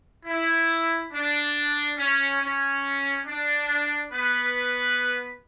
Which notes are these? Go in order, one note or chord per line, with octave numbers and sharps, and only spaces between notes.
E4
D4
C#4
C#4
D4
B3 B4